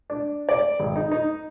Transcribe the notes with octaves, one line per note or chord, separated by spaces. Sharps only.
D4
D5
G#1
D#4
D#4